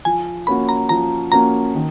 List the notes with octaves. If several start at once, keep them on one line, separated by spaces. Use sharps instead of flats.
F3 G#5
A#3 C#4 F#4 B5
A#5
F3 A#5
A#3 C#4 F#4 A#5
D#3